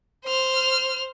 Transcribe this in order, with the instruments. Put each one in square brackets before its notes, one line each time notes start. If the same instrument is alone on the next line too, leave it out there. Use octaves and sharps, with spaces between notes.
[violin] C5 F6